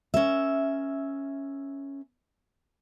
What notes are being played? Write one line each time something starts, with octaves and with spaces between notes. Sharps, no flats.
C#4 A#4 E5